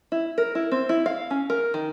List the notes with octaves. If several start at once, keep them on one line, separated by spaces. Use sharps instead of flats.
E4
A#4
E4
C4
E4
F5
C#4
A#4
D#3